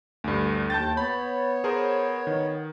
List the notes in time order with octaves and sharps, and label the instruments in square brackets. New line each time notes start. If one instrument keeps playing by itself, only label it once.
[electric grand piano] D2 G2
[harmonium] D#2 G5 [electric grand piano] A5 G6 A6
[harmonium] B3 C#5 [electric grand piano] B5
[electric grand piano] G#4 A#4 C5
D#3